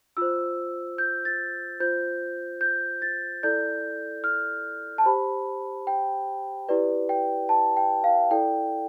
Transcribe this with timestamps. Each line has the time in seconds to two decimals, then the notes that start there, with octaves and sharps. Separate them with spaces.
0.17 F4 C5 E6
0.98 G6
1.25 A6
1.80 F4 C5 G6
2.61 G6
3.02 A6
3.43 E4 A4 D5 G6
4.24 F6
4.98 A5
5.05 G4 C5 B5
5.87 G5
6.68 E4 G4 B4 D5
7.09 G5
7.49 A5
7.77 G5
8.04 F5
8.31 E4 A4 D5 G5